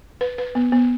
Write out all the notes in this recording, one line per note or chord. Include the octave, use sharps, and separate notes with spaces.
B4
B4
B3
B3